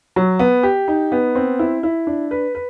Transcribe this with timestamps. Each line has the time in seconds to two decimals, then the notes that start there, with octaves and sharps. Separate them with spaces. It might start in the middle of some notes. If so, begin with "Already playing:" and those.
0.16 F#3
0.39 B3
0.63 G4
0.88 D#4
1.12 B3
1.35 C4
1.59 E4
1.83 E4
2.07 D4
2.31 B4
2.55 B4